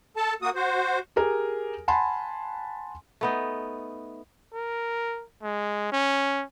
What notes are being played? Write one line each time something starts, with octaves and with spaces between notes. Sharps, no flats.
A4 A5
A#3 F#4 D#6
F#4 C5
G4 G#4 A#4 G#5
F#5 G#5 A5 B5 C6
A3 B3 D#4
A#4
G#3
C#4